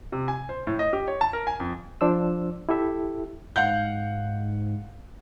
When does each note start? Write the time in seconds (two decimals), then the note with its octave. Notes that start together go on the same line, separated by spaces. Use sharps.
0.12 C3
0.28 G#5
0.49 C5
0.67 A2
0.79 D#5
0.93 G4
1.08 C#5
1.21 A5
1.33 A#4
1.47 G#5
1.60 F2
2.01 F3 D4 C5 E6
2.69 E4 G4 A4 E5
3.56 G#2 F5 F#5 G6